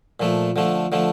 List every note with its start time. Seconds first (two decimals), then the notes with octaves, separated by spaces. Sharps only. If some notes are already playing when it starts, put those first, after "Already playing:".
0.20 A#2 F3 A3
0.56 D3 F3 A3
0.92 D3 F3 A3